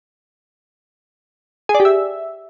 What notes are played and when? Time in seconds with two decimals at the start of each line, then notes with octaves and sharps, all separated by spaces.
1.69 G#4
1.75 D5
1.80 G4
1.85 E5